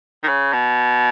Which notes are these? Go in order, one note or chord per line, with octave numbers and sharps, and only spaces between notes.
D#3
C#3
B2